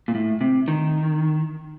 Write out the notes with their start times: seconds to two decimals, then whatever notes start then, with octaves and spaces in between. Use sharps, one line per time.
0.08 A#2
0.15 A2
0.41 C3
0.68 D#3